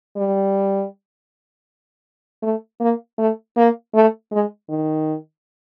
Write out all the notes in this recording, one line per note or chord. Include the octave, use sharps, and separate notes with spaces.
G3
A3
A#3
A3
A#3
A3
G#3
D#3